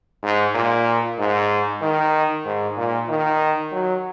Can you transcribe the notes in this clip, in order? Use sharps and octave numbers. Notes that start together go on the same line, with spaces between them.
G#2
A#2
G#2
D#3
G#2
A#2
D#3
F#3